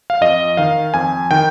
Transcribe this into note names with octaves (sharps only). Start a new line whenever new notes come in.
F5
F2 D#5
D#3 F5
F2 G#5
D#3 G5